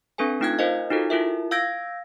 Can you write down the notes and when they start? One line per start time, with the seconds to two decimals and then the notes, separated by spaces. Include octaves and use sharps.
0.18 C4 D4 A4 B4 G#5
0.40 A3 D#4 F4 G5 F#6 G#6
0.59 F4 A#4 C5 D#5 F5
0.90 D#4 F4 F#4 A4 A#4
1.10 E4 F4 A#4 E5
1.51 F5 E6 G6 G#6 A#6 D7